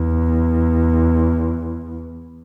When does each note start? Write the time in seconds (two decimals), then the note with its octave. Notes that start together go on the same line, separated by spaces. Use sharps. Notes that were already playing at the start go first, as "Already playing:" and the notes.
Already playing: E2